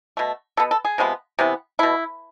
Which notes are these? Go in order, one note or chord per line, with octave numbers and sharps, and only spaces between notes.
B2 A3
B2 B3 A4
A4
G#4
C3 F3 G#3 B3
C3 E3 B3
B2 A3 E4